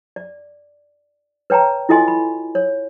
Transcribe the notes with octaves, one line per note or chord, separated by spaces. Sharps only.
D5
B4 C#5 G5 A5 A#5
E4 F4 A4 D#5 G#5 C6
B5
C#5